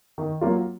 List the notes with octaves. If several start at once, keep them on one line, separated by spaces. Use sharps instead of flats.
D#3
F#3 A#3 F4